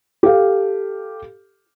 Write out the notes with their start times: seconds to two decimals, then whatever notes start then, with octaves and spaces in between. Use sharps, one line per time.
0.23 G4 A4 F5